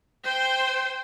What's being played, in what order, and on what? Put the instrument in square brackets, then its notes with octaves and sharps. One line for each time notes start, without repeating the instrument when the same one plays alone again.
[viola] C5 G5